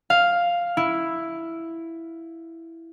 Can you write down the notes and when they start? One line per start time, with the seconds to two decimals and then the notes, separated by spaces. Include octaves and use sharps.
0.10 F5
0.77 E4